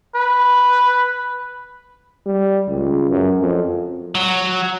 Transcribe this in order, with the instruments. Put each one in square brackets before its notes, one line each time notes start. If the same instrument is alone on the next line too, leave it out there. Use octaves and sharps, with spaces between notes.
[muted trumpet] B4
[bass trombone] G3
C#2
F#2
F2
[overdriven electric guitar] F#3